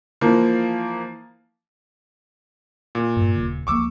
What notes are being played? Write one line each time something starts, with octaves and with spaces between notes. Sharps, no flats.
E3 F3 A#3
A#2
G2
D#1 C#3
C#2 F3 A#3 C#6 D6 E6